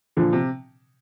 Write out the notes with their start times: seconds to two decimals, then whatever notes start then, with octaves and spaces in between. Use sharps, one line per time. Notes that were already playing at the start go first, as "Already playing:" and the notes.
0.17 A#2 D3 F3
0.33 C3